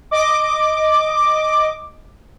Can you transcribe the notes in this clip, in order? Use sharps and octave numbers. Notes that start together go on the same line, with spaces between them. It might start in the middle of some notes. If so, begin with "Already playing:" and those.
D#5 D6